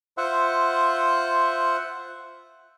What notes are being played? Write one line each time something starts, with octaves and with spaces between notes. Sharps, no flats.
F4 C5 E5 F#5